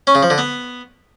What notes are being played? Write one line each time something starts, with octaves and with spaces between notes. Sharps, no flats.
C#4
C#3
F3
D3
B3